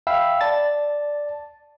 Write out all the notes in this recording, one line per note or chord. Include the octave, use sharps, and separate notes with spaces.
E5 F5 G5 B5 E6
D5 A5 A6